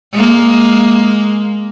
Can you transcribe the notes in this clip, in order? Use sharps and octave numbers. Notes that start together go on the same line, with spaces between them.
G#3 A#3